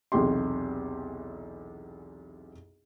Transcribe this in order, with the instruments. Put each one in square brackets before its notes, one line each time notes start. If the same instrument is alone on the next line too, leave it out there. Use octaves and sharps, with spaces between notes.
[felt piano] B1 E2 C3 G4 C6